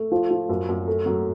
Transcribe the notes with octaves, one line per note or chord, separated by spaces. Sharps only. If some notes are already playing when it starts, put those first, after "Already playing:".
Already playing: A3
F3
F3
F#2
F#2
A3
F#3